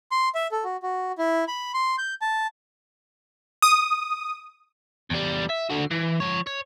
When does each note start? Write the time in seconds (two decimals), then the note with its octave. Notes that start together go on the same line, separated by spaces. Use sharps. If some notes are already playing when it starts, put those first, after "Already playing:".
0.11 C6
0.35 E5
0.51 A4
0.64 F#4
0.83 F#4
1.18 E4
1.48 B5
1.74 C6
1.98 G6
2.22 A5
3.62 D#6
5.10 E2 G3
5.50 E5
5.70 D3 F#4
5.91 E3
6.20 F3 C#5
6.47 C#5